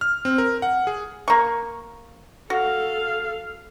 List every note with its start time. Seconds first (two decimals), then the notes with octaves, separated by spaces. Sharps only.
0.01 F6
0.25 C4
0.38 A#4
0.62 F#5
0.87 G#4
1.28 A#3 C#6
2.50 F#4 A4 F5